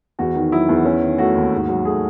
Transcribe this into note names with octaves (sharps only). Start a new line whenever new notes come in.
E2 F#4
D#3
F#3 E4
E2
C#4
D#3
A3 F#4
D#2
G#2
F#3
A3 G#4